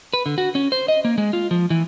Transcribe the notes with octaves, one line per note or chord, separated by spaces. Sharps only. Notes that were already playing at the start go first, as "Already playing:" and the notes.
B4
D3
F#4
C#4
C5
D#5
A#3
G#3
F4
F3
E3